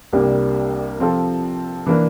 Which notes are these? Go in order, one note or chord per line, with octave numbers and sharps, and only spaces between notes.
C2 C3 G3 A#3 D4
F3 C4 F4 A4
E3 A#3 D4